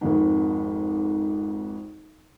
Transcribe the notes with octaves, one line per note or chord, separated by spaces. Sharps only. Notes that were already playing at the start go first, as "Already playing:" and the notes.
G#1 F2 G#2